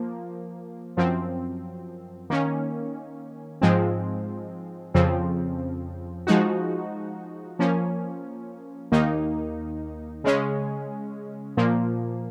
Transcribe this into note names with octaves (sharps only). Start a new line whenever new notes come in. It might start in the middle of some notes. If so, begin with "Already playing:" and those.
Already playing: F3 A#3
F#2 F3 C4
D#3 A#3 C#4
G#2 F3 G#3 C4
F2 C#3 F3 C4
F3 G#3 D#4 F#4
F3 A#3 C#4
D#2 D#3 A#3 D#4
C#3 G#3 C#4
A#2 F3 A#3